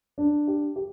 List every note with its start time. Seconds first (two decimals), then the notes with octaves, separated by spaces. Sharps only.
0.18 D4
0.47 G4
0.76 G4